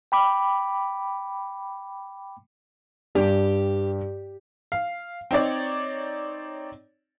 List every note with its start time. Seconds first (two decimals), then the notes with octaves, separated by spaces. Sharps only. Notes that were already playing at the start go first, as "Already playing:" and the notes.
0.12 G5 B5 D6
3.15 G2 G4
4.72 F5
5.31 C4 D#4 C#5 D5